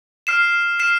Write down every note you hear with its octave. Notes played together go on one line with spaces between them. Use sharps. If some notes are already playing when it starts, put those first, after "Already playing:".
F6 C7 E7
F6 C7 E7